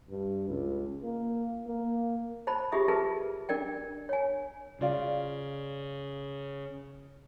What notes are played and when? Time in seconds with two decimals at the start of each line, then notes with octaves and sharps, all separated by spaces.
0.10 G2
0.49 C#2
1.04 A#3
1.67 A#3
2.47 C5 A5 B5
2.72 F4 G4 G#4 E5 D#6
2.88 F4 G#4 A#4 B4 A5
3.49 D4 A#4 D5 G5
4.09 C#5 G#5
4.81 C#3 F4 D5 F5